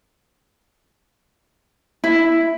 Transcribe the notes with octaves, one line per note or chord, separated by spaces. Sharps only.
E4